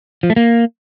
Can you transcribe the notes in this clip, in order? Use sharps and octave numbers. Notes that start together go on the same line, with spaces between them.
F3
A3
A#3